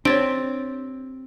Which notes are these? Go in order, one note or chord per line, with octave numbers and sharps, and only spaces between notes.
C4 D4 G4 C5 C#5 A6 D7